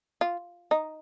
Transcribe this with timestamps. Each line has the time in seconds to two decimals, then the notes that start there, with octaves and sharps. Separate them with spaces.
0.21 F4
0.71 D#4